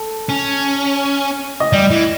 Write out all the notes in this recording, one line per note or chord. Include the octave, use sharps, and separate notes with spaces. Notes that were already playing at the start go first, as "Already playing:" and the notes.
Already playing: A4
C#4
D#5
G3 D5
E3